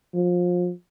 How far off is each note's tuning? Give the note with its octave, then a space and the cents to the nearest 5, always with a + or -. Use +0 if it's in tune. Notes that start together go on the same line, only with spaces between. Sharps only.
F3 +25